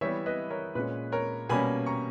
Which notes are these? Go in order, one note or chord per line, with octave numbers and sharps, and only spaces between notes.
E3 G3 B3 C#5 E5
B4 D#5
A#4 C#5
A#2 G#3 C#4 B4
A#4 C#5
B2 G3 A#3 C#4 G#5 B5
A#5 C#6